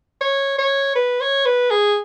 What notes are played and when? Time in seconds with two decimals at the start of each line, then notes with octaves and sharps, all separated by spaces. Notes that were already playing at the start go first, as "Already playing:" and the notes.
0.21 C#5
0.59 C#5
0.95 B4
1.21 C#5
1.46 B4
1.71 G#4